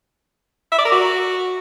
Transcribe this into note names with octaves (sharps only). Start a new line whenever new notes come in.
E5
D5
A#4
F#4